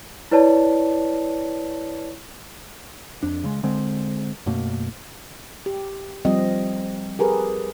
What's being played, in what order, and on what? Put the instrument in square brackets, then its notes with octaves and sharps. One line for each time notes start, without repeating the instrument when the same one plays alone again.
[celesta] E4 B4 C#5 D5 A5
[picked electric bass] F2 D4
C#3 G#3
D3 G#3 C4
F#2 B2 A3 A#3
[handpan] G4
F3 G3 C4 D#5
G4 G#4 A#4 B4